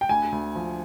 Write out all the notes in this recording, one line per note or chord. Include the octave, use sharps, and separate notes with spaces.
G5
D2 G#5
D2
F3